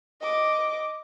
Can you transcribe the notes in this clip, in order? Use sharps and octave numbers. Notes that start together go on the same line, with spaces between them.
D#5 D6